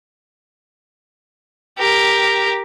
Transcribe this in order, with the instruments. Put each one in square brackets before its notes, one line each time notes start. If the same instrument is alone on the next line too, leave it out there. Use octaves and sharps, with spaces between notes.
[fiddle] G4 A#4